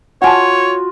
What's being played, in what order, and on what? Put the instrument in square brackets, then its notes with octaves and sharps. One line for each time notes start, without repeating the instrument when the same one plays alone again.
[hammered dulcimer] F4 F#4 [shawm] C#5 [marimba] F#5 G#5 A5